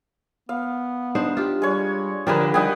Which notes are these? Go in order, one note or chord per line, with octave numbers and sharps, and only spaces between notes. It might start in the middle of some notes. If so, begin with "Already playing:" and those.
B3 F5
D4 D#4 C5
F4 G4
G3 G#3 C#5
D3 F3 D4 G4 G#4 A#4 B4
G3 D#4 G4 G#4 F#5 D#6